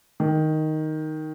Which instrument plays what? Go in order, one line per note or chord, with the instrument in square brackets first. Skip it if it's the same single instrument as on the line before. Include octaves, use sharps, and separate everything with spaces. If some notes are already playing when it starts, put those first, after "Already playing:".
[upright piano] D#3